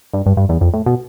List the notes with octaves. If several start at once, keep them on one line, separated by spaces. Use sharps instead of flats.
G2
G2
G2
E2
F2
A2
B2